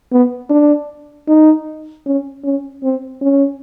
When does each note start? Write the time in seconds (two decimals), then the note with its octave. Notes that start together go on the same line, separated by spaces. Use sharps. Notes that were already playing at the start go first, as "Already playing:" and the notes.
0.12 B3
0.50 D4
1.28 D#4
2.06 C#4
2.44 C#4
2.83 C4
3.21 C#4